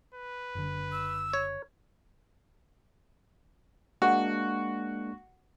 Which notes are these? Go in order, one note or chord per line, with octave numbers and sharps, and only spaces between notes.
B4
F#1 D3
E6
C#5
G#3 A#3 D4 F#4